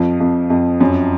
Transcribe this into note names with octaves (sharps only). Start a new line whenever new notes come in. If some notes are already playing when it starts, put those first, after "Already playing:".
Already playing: F2 F3
F2
F2
F#2